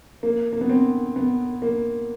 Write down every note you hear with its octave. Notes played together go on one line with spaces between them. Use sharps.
A#3
A#3
B3
C4
B3
A#3